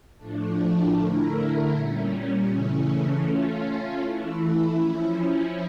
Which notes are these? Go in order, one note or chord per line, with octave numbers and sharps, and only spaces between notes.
A2 F3 A3 D4
D3 A3 E4 A#4
A#2 G3 C#4
C#3 E3 A3 C#4
A3 C#4 F4
E3 A3 E4
F3 C#4 E4